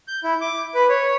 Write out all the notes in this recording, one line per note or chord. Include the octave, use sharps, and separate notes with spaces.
G6
E4
D6
B4
C#5